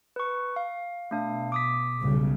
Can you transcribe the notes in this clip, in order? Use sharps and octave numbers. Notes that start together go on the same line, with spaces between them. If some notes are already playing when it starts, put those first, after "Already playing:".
B4 C#6
F5
B2 A3 D4 F5
D6 D#6 B6
B1 C#3 G3